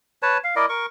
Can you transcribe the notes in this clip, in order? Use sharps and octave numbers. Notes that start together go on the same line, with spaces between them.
B4 C#5 A5
F5
E4 A#4 D5 D#5
A#4 C#6